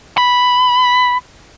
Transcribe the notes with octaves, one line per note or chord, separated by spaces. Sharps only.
B5